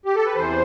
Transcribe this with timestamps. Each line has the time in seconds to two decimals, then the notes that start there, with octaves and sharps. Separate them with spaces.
0.06 G4
0.15 A4
0.26 B4
0.36 E2 C3 E3 C5